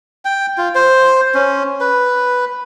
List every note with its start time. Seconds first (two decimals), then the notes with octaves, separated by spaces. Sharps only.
0.25 G5
0.58 F4
0.75 C5
1.34 C#4
1.81 B4